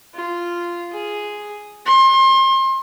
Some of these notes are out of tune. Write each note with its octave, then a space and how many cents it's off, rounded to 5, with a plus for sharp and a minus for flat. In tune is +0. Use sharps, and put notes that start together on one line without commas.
F4 -10
G#4 +0
C6 +35